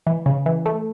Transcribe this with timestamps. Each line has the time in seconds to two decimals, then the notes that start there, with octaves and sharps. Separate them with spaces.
0.07 E3
0.26 C#3
0.46 E3
0.66 A3